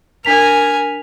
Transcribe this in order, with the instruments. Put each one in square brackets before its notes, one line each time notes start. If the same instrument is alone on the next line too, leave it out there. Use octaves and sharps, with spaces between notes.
[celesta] D4 B6 F7 [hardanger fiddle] A#4 G#5